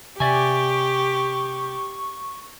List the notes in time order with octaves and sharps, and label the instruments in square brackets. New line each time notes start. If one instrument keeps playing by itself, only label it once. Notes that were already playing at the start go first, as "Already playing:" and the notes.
[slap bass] C3 [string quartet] G4 [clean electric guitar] D5 E5 G#5 [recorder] C#6